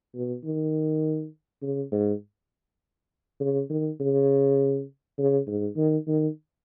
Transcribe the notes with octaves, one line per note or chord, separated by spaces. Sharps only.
B2
D#3
C#3
G#2
C#3
D#3
C#3
C#3
G#2
D#3
D#3